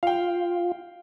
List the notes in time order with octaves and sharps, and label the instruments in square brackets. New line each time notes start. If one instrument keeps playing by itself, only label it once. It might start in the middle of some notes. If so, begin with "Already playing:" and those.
[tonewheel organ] F4 [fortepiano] F5 G5